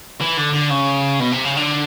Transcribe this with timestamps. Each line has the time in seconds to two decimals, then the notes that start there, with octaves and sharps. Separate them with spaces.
0.21 E3
0.37 D3
0.54 D3
0.70 C#3
1.20 B2
1.32 C3
1.45 C#3
1.56 D3